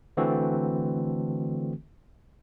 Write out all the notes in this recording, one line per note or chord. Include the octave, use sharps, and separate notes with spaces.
D3 E3 A3 C4 F#4 A4